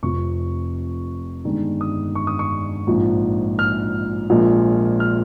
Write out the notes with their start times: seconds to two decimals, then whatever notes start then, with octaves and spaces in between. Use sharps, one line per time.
0.03 F1 F2 C3 F3 C#6
1.45 G1 G2 D#3 G#3
1.81 D#6
2.15 C#6
2.27 D#6
2.39 C#6
2.87 A#1 G#2 F3
3.59 F6
4.30 A#1 A#2 F3 G#3
5.00 F6